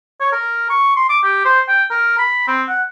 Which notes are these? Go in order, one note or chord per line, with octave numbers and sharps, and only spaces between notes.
C#5
A#4
C#6
C6
D6
G4
C5
G5
A#4
B5
C4
F#5